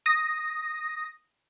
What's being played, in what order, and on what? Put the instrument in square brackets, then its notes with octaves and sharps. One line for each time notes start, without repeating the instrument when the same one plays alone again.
[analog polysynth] D#6 A#6